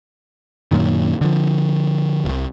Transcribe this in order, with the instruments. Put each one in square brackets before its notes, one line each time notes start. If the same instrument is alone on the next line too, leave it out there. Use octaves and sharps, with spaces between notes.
[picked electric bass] F#2 A#2 D#3
D3 F3
E1 C2